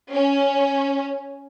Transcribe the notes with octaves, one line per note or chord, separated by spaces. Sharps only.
C#4